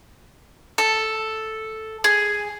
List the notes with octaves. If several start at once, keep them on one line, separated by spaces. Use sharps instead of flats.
A4
G#4